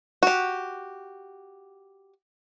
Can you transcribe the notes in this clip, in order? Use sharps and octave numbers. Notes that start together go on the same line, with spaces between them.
F#4 G4